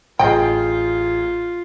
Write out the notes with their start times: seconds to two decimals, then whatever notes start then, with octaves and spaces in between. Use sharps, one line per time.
0.19 A1 F4 G#4 D#5 G5 G6